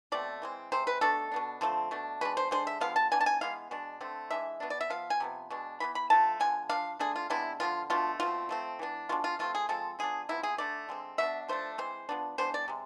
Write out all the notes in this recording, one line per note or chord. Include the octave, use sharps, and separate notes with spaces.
B2 A3 C4 D5
E3 G#3 C4
C3 G#3 C4 C5
B4
B2 A3 D4 A4
B2 B3 D4
D3 F3 A3 C4
B2 A3 D4
B2 G#3 D4 B4
C5
D3 G#3 D4 C5
E5
D3 F3 G#3 B3 F5
A5
E3 B3 D4 G#5
A5
G#5
E3 G#3 B3 F5
B2 G#3 D4
D3 A3 C4
E3 G#3 D4 E5
B2 B3 D4
D5
E5
F3 B3 F5
G#5
C3 F3 B3
B2 G#3 D4
E3 G#3 B3 B5
B5
D3 F3 A3 A5
D3 F3 B3 G#5
F3 B3 D4 F5
D3 A3 D4 G#4
F4
C3 G#3 B3 D4 E4
D3 F3 G#3 B3 F4
B2 A3 D4 F4
B2 A3 C4 F4
F3 A3 C4
E3 B3 D4
B2 G#3 D4 F4
F4
F3 A3 C4 F4
G#4
F3 G#3 C4 A4
F3 B3 D4 G#4
C3 F3 B3 E4
G#4
D3 A3 D4 D5
D3 G#3 C4
B2 B3 D4 E5
F3 A3 D4 C5
E3 G#3 C4 C5
F3 B3 D4
E3 G#3 B3 D4 C5
D5
C3 G#3